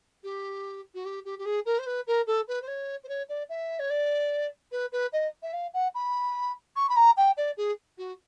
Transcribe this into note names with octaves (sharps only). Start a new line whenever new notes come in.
G4
F#4
G4
G4
G4
G#4
A#4
C5
B4
A#4
A4
B4
C5
C#5
C5
C#5
D5
E5
C#5
D5
B4
B4
D#5
E5
F5
F#5
B5
C#6
B5
A#5
G5
D5
G#4
F#4